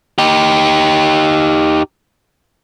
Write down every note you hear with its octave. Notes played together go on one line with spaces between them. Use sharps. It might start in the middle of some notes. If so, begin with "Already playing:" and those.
D#4 G4